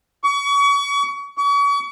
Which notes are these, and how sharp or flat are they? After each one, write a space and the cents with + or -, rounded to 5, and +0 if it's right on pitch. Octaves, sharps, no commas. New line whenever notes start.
C#6 +35
C#6 +40